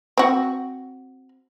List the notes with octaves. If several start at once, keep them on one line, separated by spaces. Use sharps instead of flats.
C4 F#4